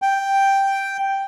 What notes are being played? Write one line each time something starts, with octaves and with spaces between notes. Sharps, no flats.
G5